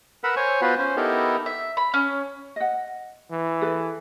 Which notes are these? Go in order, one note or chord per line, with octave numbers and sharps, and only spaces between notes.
A#4 B4 F#5 B5 E6
C5 C#5 G#5 C#6
B3 F4 F#4 B4 C5
C#4 C5
B3 D#4 E4 G4 A4 A#4
E5
B5
C#4
D#5 F#5
E3
G#4 A4 B4